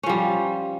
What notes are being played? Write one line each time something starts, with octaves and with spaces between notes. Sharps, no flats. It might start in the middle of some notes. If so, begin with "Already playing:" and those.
F3 G3 C#4